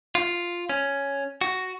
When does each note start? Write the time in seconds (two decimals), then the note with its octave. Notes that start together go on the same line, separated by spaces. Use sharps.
0.15 F4
0.69 C#4
1.41 F#4